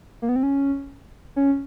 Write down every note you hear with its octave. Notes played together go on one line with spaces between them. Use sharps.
A#3
B3
C4
C#4
C#4